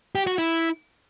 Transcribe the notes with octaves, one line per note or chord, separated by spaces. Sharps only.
G4
F#4
E4